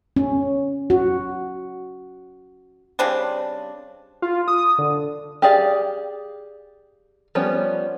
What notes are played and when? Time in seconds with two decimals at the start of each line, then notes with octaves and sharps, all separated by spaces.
0.16 C#4
0.90 F#4
2.99 C#3 G3 C4 D4
4.22 F4
4.48 D#6
4.78 D3
5.42 G4 G#4 D5 F5
7.35 F3 G3 B3 C#4